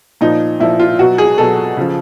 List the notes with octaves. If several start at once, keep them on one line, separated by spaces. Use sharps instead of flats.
A#2 F3 D#4
A#2 F3 E4
F4
B2 F#3 F#4
G#4
B2 F#3 A4
C#3 F3